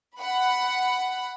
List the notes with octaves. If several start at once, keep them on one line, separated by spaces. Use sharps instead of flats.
F#5 B5